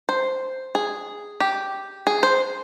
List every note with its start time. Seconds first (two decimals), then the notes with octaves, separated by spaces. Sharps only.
0.09 C5
0.75 G#4
1.40 G4
2.07 G#4
2.23 C5